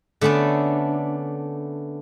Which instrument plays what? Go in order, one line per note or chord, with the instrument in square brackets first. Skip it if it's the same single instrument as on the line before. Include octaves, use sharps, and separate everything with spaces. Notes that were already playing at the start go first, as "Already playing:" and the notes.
[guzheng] D3 A3 B3 C#4 D4